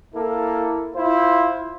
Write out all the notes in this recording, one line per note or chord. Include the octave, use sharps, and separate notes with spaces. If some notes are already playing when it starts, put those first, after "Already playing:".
A#3 E4 A4
E4 F4 C5